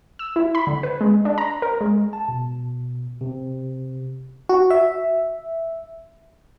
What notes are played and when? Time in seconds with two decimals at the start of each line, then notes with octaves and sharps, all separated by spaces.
0.19 E6
0.36 E4
0.55 B5
0.67 D3
0.83 B4
1.01 G#3
1.25 D4
1.38 A#5
1.62 A#4
1.81 G#3
2.13 A5
2.28 B2
3.21 C3
4.49 F#4
4.70 E5